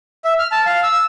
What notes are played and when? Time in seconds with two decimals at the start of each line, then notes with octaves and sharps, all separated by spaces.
0.25 E5
0.39 F6
0.52 A5
0.66 F5
0.83 E6